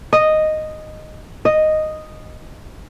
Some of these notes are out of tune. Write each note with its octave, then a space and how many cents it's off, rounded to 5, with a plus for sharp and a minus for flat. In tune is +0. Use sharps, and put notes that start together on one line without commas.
D#5 -5
D#5 -5